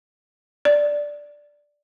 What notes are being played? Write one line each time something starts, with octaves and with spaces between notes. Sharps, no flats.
D5